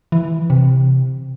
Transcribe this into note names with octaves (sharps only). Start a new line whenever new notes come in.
E3
C3